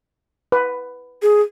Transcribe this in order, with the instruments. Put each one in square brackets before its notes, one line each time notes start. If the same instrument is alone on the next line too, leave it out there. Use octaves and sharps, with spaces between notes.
[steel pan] B4
[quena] G#4